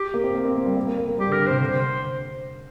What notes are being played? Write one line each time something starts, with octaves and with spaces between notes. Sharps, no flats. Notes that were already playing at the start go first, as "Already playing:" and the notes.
Already playing: G4
A#3
C4
A#3
C4
A#3
G3
A#3
A#3
A#3
A#3
G3 G4
D3
A#4
D3
C3 C5
D3 C5